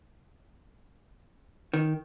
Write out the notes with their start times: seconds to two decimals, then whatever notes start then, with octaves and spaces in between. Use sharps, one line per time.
1.74 D#3